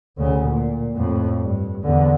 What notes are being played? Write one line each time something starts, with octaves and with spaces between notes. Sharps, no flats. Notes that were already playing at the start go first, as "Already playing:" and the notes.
D2 C#3
A#2
F2 A2
G2
E2 D3